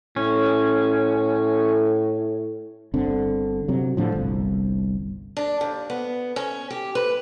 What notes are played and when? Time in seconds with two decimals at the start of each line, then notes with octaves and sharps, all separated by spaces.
0.16 A2 C#4
2.94 G1 D3 C4
3.68 C3 F#3
3.97 A2 D3 F3
4.15 G1 C2
5.37 D4
5.61 D#2
5.90 B3
6.36 C#4
6.71 G4
6.95 B4